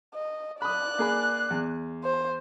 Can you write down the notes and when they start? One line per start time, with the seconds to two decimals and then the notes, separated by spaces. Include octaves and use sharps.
0.14 D#5
0.62 D5 B5 D#6 F#6
0.99 A#3 G#4 B5
1.50 E2
2.04 C5